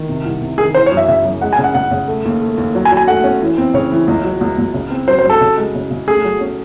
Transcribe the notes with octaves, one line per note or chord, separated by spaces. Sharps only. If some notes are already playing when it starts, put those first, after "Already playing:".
Already playing: D#3
C3
C2
C3
D#3 G#4
E3 C5
C#5
F#2
E5
C#3 E5
F#2
G#3 F#5
G#5
C#3
F#5
C#3 F#5
C#3
A3
D#2
A3
D#2
F#3
G#5
F#3
G#5
A3 F#5
C#4
E3
C4
C#3 C#5
E3
C#2
F#3
C#2
C#2
C#3
C4
F#3 C5
C5
F#3
A4
C#3
G#3
C#3
C#3
A3 G#4
F#3
C#4